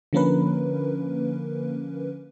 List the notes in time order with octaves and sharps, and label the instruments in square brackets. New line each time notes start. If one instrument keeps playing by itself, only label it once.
[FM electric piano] D3 F3 A#3 C#4 A#4 B4